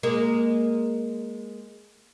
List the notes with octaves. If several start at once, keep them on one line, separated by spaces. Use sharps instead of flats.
G#3 A#3